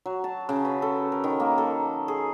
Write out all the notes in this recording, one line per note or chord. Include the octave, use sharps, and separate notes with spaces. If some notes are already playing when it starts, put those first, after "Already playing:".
F#3
A5
C#3
B4
A4
A#4
D#3
A#3
A4
G#4